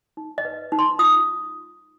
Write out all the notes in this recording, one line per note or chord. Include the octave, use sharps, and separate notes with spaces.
D#4
D#5
B4
D#4
C6
F4 D#6